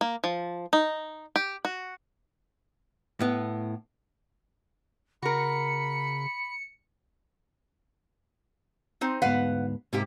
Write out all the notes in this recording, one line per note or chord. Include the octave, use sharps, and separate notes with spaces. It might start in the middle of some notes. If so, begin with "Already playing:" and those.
A#3
F3
D#4
G4
F#4
A2 B3
C#3 F#4 A#4 B5 C#7
C4 D#4 C5
D2 G#2 B3 B4 F5 F#5
G#2 C3 A#3 G4